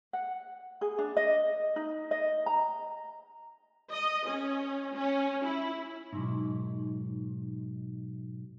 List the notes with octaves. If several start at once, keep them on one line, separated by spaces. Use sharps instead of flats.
F#5
G#4
D4
D#5
D#4
D#5
A#5
D#5
C#4
C#4
E4
B1 G#2